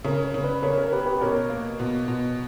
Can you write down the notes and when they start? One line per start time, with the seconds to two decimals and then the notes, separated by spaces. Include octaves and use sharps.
0.04 C#3 A#4 C#5
0.24 A#4 C#5
0.34 C#3
0.43 B4 D5
0.62 C#3 A#4 C#5
0.78 A#4 C#5
0.92 B3 G4 B4
1.06 G4 B4
1.21 B2 A#4 C#5
1.50 A#3
1.80 B2
2.08 B2